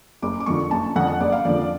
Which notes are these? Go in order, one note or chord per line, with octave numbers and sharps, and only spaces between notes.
F#1 D6
D6
F2 D3 F3 C#6
F#1 A5
F2 D3 F3 F#5
F#1 D5
F5
F2 D3 F3 D5